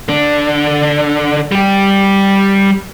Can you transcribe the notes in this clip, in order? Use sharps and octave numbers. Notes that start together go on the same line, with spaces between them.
D3 D4
G3 G4